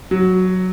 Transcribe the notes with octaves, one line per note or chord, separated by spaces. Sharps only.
F#3